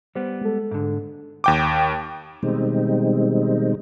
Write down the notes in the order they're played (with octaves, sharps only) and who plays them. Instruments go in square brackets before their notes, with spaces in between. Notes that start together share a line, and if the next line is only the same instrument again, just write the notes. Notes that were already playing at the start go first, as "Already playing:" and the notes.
[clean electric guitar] G3 B3 [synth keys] C5
[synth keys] G#3 A4
[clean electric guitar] G#2 D3
[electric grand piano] D#2 G5 D6
[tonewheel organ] B2 D#3 G3 G#3 C4 D#4